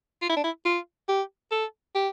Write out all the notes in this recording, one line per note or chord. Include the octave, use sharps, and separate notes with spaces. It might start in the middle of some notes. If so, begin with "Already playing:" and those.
F4
E4
D4
E4
F4
G4
A4
G4